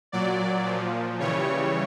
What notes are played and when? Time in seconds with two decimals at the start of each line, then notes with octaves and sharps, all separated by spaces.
0.12 A#2 F#3 D5
0.66 A#2 F3
1.20 C#3 E3 G3 C#5